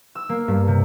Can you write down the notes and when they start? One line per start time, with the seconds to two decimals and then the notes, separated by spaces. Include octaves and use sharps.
0.15 E6
0.29 A#3
0.48 G2
0.68 C3